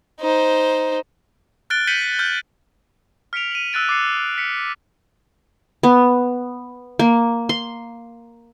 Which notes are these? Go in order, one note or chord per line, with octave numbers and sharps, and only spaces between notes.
D#4 C5
F6 F#6 A6 D7 G7
G6 B6 C#7 D#7 F#7 G7
F6 G6
F6 B6 C#7 D7 F7
D#7 F#7
D#6 E6 F#6 A6 D7
D6 A6 C7 C#7
F#6
B6 C#7
B3
A#3
C6